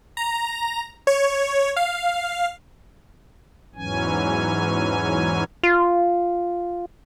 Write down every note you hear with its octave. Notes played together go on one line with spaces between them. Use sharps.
A#5
C#5
F5
E2 G#2 E3 F#3 C#4 G#5
F4